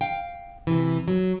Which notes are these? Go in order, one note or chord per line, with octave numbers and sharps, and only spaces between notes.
F5 G5
C3 E3
F#3